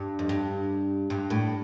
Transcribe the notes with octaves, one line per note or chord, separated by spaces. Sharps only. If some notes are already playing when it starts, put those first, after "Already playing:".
Already playing: G2
F2
G2
G2
A2